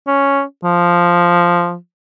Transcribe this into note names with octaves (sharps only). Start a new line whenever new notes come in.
C#4
F3